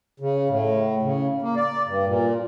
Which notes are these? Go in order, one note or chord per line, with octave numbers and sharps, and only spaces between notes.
C#3
A2
C#3
A#3
D5
G2
A#2